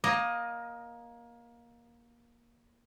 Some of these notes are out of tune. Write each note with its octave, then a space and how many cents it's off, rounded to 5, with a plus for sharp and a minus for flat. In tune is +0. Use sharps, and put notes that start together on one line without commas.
A#3 +20 D#5 +0